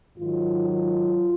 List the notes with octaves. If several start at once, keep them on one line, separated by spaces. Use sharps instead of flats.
G#2 D#3 F#3 F4
F4